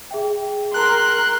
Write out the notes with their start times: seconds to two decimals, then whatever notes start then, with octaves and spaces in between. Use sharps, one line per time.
0.11 G#4 E5 G5
0.74 A#4 C6 F#6